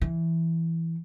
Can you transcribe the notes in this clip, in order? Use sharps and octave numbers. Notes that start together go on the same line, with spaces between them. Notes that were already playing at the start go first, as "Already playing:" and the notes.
E3